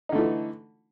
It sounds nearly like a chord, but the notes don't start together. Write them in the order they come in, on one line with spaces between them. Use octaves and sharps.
D#4 D3 A3 E3